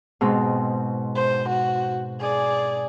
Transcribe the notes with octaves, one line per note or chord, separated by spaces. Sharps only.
G#2 B2 C4
C5
F#4
G#4 D5